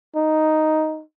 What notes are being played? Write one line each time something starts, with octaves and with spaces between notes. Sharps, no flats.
D#4